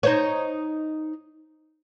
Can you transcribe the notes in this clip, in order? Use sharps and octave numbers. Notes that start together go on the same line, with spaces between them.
D#4 C5 C#5